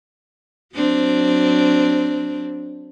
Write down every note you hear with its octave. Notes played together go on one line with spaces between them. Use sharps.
F#3 C4 D4